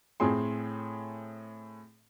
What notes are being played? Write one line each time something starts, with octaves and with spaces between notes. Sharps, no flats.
A2 C4 G#4 C6